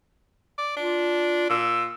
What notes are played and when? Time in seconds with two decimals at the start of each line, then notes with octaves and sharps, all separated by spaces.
0.58 D5
0.77 D4 F4
1.50 A#2 E6